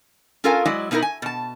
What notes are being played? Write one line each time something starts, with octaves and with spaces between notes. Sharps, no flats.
C#4 F4 A4 A#4 F5 G#5
F#3 G#3 E4 D5 D#5
B2 B3 D#4 E4 A#4
G#5
B2 A5